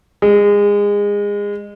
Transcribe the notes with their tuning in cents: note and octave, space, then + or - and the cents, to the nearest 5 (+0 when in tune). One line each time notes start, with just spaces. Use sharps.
G#3 -25